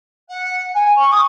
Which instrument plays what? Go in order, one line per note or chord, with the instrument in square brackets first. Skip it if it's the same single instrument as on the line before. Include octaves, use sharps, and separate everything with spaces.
[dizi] F#5
G#5
C#6
D#6